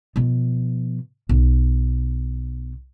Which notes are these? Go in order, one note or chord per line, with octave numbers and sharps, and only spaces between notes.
B2 F3
B1